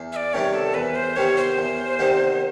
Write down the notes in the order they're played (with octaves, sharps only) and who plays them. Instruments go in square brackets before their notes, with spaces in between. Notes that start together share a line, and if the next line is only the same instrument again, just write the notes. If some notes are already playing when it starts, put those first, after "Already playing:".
Already playing: [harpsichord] E2
[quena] E5
D5
[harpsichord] C3 D#3 G3 B3 [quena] C#5
[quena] A4
[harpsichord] E2 [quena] B4
[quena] C5
[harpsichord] C3 D#3 G3 B3 [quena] C#5
[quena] C5
[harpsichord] E2
C3 D#3 G3 B3